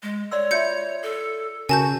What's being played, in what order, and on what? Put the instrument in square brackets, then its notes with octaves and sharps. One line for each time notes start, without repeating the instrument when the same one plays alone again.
[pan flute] G#3
[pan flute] C#5 [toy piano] D5 C6 E6
[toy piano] F4 E5 C6 [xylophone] G6 C#7
[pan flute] A4
[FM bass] C#3 [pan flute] F#4 [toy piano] A#4 [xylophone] G#5 A5 G6